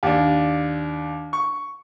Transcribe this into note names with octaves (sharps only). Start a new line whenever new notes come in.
D#2 D4
C#6